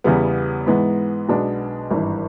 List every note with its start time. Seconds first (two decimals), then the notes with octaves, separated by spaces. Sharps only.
0.04 E2 C#3 E3 G3 B3
0.67 G#2 E3 G#3 B3
1.28 B1 B2 G#3 B3 D4
1.90 G#1 G2 E3